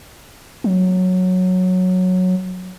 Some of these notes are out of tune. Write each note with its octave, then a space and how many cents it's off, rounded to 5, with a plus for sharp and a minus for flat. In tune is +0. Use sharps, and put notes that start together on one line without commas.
F#3 -10